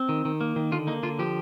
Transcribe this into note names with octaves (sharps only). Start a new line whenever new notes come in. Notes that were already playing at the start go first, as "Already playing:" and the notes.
Already playing: C4
D#3
D#3
A#3
D#3
D3 F4
A#3 D#4
D3 F4
F3 G4